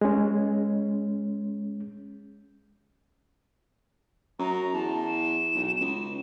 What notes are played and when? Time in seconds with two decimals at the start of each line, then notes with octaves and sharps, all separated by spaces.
0.01 G#3 C#4
4.39 F#2 A#5
4.73 E2 A5
5.07 E7
5.55 B1
5.81 C#2